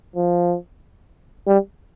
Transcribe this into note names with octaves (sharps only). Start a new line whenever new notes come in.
F3
G3